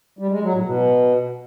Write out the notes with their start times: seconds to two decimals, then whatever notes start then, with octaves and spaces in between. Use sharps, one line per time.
0.19 G3
0.30 G#3
0.42 F#3
0.54 A2
0.65 B2